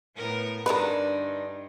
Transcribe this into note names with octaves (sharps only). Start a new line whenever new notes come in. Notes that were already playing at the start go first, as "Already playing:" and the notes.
A2 B3 A#4
G2 D3 D4 D#4 A#4 B4